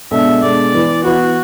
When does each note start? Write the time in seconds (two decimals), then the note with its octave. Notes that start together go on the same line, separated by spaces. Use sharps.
0.11 B2 G#3 D4 A4 E5
0.42 B2 G#3 D4 A4 D5
0.74 E3 B3 E4 B4
1.05 E3 B3 E4 F#4 B4